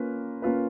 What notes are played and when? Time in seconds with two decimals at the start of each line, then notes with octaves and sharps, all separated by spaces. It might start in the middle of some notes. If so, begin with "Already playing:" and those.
Already playing: A#3 C#4 F4 B4
0.42 A#3 C#4 F4 B4